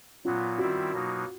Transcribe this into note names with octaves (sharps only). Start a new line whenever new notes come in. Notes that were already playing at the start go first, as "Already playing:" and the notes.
A#2 F#3 B3 F4
D#3 G3 C4 E4 F#4
B2 F#3 A#3 D#4